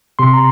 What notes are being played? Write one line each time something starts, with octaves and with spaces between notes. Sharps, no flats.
C3 C6
A#5